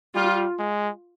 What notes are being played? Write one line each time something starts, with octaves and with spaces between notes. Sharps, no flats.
G3 F4
G#3